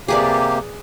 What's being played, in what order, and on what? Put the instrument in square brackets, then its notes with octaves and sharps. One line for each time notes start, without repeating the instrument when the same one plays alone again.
[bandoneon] C3 A#3 G4 [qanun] G#4 B4 D5